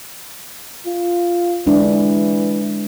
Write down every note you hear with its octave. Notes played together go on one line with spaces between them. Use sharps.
F4
E3 G#3 D4